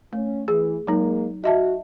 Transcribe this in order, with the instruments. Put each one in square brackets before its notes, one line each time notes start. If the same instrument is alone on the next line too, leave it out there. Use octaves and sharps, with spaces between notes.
[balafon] A3 [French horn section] C#4
[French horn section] E3 [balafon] G#4
[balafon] F#3 D#4 [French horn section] G#3 A#3
[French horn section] F#4 [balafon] D#5 E5 A5